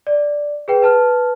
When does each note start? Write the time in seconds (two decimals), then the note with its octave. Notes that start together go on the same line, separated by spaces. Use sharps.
0.07 D5
0.68 G#4 B4 G5
0.82 B4 A5 F6